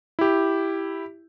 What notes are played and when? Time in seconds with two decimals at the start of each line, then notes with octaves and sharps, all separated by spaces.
0.19 E4 G4